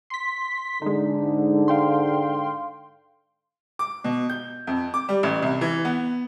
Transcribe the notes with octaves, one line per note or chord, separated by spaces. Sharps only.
C6 B6
G#2 D3 G#3 D#4
F5 G5 C6
D6
B2
G6
F2
D6
G3
A1
C2
E3
B3